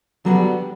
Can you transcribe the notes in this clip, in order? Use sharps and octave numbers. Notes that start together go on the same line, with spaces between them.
D3 F#3 G3 B3 D4 F#4